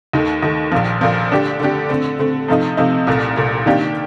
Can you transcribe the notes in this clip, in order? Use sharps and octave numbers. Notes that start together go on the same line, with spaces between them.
D#2 D#3 A3
D#2 D#3 A3
A#1 A#2 F3
A#1 A#2 F3
D3 A3 D4 G4
D3 A3 D4 G4
D3 A3 C4
D3 A3 C4
C3 F3 A3 D#4
C3 F3 A3 D#4
C2 A#2 A3
C2 A#2 A3
D#3 A#3 D4 G4